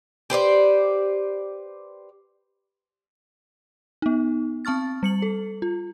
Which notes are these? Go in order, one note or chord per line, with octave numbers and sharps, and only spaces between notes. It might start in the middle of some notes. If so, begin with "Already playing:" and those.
G4 B4 C5 D5
B3 D#4
C4 A5 C#6 F6 A6
G3 C#7 F#7
A4
F4